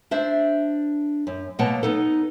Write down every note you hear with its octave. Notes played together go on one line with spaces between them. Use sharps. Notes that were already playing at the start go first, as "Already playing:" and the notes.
D4 C5 E5
F#2
B2 F#3 A#3 F#5 G5 A5
B3 D#4 A4